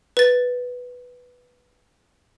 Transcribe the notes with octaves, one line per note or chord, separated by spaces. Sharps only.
B4 A6